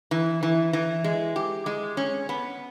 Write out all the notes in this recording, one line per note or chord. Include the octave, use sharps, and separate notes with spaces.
E3
E3
E3
G#3
G4
G#3
C#4
B3